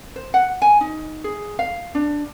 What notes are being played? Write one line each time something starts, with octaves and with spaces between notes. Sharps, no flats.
C5
F#5
G#5
D#4
G#4
F5
D4